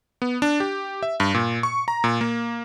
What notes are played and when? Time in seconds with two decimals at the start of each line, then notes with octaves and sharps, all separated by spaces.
0.22 B3
0.42 D4
0.60 G4
1.03 E5
1.20 G2
1.34 A#2
1.63 C#6
1.88 A#5
2.04 A#2
2.21 A#3